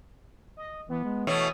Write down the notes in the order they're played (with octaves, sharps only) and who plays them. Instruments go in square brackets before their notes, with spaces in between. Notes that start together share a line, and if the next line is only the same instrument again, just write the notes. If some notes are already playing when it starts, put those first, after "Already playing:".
[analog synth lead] D#5
[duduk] E3 [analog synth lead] B3
[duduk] G#3
[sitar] B2 E3 A3 [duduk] C#5 [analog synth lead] D#6